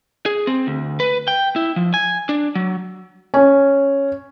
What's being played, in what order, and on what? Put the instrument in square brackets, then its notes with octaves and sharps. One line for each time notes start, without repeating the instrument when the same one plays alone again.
[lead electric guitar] G#4
C4
D2
B4
G5
E4
F3
G#5
D4
F#3
[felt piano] C#4 G#5